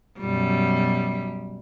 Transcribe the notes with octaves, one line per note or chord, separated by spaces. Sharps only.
F#2 B2 G3